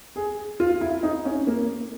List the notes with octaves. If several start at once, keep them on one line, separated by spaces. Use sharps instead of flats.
G#4
F4
E4
D#4
C#4
A#3